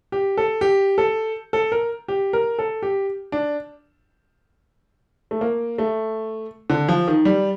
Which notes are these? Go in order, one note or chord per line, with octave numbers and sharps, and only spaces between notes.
G4
A4
G4
A4
A4
A#4
G4
A#4
A4
G4
D4
A3
A#3
A3
D3
F3
D#3
G3